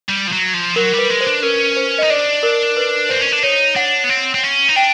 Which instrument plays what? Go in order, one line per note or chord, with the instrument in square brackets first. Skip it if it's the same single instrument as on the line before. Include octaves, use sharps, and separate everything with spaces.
[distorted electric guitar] G3
F3
F#3
F3
[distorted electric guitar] F#3 [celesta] A#4
[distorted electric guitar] G3
[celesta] B4
[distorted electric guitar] G#3
[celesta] C5
[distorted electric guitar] D4
[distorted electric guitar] C#4 [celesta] A#4
[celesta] C5
[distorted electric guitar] D#4 [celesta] D#5
[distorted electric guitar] D4 [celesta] D5
[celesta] A#4
B4
[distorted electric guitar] C4 [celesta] C5
[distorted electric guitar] C#4
D4
[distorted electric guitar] D#4 [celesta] C#5
[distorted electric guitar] D4 [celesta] F#5
[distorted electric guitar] B3
C4
C4
C#4
D#4
[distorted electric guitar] D4 [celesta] G5